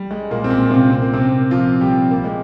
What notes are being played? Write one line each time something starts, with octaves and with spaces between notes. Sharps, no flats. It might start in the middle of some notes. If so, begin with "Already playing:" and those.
Already playing: G3
G#3
A#2 A#3
C4
A#2 A#3
C3 C4
C4
A#3
C3 C4
F3 F4
G3 G4
A#3
G#3